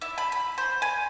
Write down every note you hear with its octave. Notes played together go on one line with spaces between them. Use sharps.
E4
B5
B5
C5
G#5